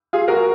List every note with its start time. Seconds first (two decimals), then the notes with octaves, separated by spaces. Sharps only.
0.13 F4 G#4
0.28 F#4 A#4